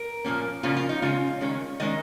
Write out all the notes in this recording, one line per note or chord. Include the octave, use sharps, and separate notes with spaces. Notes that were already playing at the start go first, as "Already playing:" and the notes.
Already playing: A#4
A#2 F3 A#3 C#4
C#3 F3 A#3 C#4 F4
F4
D#4
C#3 G#3 C#4 F4
D#3 G#3 C#4
D#3 G#3 C#4 D#5